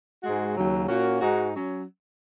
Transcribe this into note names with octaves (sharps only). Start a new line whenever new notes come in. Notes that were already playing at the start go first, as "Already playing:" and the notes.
G#2 G#3 F#4
D#2 C#3 F#3
A#2 A#3 C#4 F#4
G#2 G#3 D#4 F#4
F#3 C#4